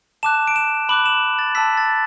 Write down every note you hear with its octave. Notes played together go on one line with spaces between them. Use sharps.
A5 D6 F#6 E7
D7
E7
B5 D6 F#6 F#7
E7
A6
A5 E6 B6
A6